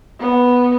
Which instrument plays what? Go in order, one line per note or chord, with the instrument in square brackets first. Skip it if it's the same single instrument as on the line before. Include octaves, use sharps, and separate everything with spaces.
[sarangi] B3